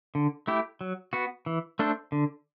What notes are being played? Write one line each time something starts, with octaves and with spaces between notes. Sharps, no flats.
D3
A3 E4 G4
F#3
B3 F#4
E3
A3 D4 A4 C5
D3